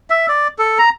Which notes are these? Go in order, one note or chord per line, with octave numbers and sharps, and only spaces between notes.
E5
D5
A4
A#5